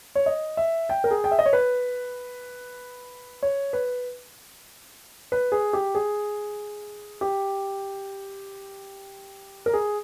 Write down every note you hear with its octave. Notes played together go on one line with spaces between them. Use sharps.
C#5
D#5
E5
G5
A#4
G#4
G5
E5
D#5
C#5
B4
C#5
B4
B4
G#4
G4
G#4
G4
A#4
G#4